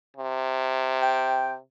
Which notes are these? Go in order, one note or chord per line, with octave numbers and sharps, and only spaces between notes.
C3
G5